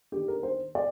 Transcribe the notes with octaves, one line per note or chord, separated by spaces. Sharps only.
D#3 A#3 D4 G4
A#4
C5
D5